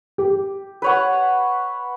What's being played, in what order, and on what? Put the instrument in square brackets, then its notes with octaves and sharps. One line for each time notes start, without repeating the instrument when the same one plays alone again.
[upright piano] G4
[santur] B4 C#5 F#5